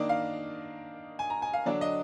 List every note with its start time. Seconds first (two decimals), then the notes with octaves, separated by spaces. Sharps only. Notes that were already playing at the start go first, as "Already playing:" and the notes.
Already playing: D#3 A#3 D4 D5 D#5
0.09 F5
1.19 G#5
1.30 A#5
1.42 G#5
1.53 F5
1.66 D3 F#3 D4 D5
1.81 D#5